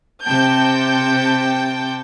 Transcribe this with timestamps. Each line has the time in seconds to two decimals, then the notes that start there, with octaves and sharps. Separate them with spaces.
0.24 C3 G5 A5 G6